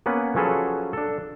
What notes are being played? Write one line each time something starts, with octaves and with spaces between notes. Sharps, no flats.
A#3 B3 C#4 B4
F3 F#3 C#4 G#4 A4 B4
D4 A4